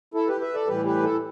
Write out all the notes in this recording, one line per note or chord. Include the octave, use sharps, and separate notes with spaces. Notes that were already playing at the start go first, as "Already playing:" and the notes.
E4 A4
G4 B4
B4 E5
A4 D5
A2 E3 G3 G4 B4
G4 B4
E4 A4